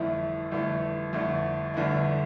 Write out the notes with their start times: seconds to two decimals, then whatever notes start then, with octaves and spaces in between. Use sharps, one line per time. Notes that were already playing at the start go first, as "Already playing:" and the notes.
Already playing: G1 F2 E3 A3 E4
0.51 G1 F2 E3 A3 E4
1.13 G1 F2 D3 A3 E4
1.74 G1 F2 D3 A3 E4